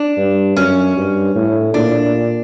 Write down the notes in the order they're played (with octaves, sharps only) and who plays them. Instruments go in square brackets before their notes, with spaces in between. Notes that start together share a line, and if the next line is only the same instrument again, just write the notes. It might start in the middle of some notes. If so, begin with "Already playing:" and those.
Already playing: [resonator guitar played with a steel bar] D4
[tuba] G2
[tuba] F#2 [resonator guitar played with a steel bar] C#4
[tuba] G2
A2
[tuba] A#2 [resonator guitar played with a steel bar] D4